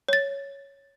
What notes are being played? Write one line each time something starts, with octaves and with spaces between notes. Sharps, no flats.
C#5 A6